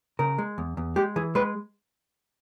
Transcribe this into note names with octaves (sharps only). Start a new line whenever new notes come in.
C#3 A#4
G#3
E2
E2
G#3 G4
E3 G#4
G#3 B4